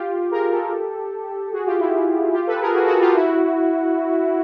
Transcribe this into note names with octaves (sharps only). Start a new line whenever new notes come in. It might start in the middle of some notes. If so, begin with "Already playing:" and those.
Already playing: F4 G4
G#4 A#4
G4 A4
F#4 G#4
F4 G4
E4 F#4
F4 G4
A4 B4
G#4 A#4
F#4 G#4
A4
F#4 G#4
F4 G4
E4 F#4